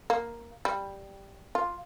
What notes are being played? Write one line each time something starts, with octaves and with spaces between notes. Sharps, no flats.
A#3
G3
F4